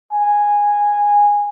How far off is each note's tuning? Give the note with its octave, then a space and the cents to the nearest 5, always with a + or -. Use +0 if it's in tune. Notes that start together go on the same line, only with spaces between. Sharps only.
G#5 -10